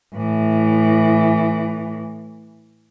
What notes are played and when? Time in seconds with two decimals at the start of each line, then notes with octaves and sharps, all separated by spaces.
0.15 A2 E3